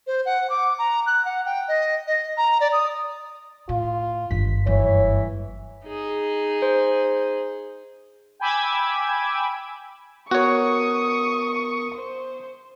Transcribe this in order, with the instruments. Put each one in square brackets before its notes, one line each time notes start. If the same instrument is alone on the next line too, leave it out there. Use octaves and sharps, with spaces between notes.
[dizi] C5
F#5
D6
A#5
F#6
F#5
G5
D#5
D#5
A#5
D5
D#6
[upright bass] A2 [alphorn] F4
[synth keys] G1 G2 B6 [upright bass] D#3
[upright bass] F#1 G3 [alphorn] E3 [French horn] C#5
[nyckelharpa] D#4 G#4
[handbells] C5
[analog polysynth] G5 G#5 B5 D6 E6 G#6
[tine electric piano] B3 A#4 [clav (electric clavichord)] F#4 C#5 [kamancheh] C#6 D#6
[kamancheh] C5